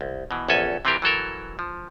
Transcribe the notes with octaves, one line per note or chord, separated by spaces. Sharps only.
C2
B2 E3
A#1 E2 C#4 A4 G#5
C3 E3 C4 F4 G4 A#4
E3 F#3 A4 A#4
F3